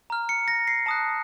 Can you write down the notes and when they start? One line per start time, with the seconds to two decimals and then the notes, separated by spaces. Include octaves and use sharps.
0.10 A#5 F6
0.29 C#7
0.48 A#6
0.67 C7
0.86 A5 D#6 F#6